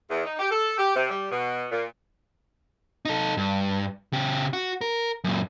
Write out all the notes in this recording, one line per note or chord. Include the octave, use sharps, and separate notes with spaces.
E2
D#4
G4
A4
G4
C3
G3
B2
A#2
D#4 A4
G2
C#3 G4
F#4
A#4
F#2 A#2